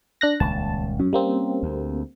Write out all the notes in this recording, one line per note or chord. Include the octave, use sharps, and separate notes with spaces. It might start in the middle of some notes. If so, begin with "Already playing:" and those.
D4 F#6 A#6
D#1 C#2 A5
F#2 C#4
G3 A#3 C4
D2